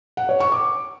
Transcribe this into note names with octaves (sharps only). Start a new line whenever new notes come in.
F#5
C#5
C#6
D6